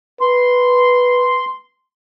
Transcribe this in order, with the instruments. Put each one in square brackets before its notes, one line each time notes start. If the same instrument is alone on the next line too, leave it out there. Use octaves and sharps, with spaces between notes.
[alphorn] B4 [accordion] C6